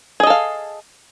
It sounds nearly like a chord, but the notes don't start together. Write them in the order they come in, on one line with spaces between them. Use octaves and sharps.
G#4 D#5 A4 F5